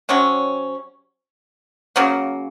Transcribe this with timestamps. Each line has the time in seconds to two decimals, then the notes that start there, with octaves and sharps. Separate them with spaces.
0.09 C3 F#3 C#4
1.96 C#3 F#3 A#3